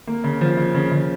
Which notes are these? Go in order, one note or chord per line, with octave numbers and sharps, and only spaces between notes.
A#3
C#3
F3
C#3
C#3
C#3